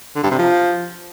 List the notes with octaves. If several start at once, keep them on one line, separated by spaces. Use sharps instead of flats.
D3
G2
C3
F3